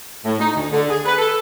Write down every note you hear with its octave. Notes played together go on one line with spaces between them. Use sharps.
A2
D#4
D2
D3
G#4
B4
A4